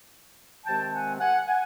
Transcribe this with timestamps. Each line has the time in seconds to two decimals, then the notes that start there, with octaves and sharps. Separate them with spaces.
0.65 C3 D#3 G#3 C4 G5 A5
0.93 F#5 G#5
1.20 F#5 G#5
1.47 F#5 G#5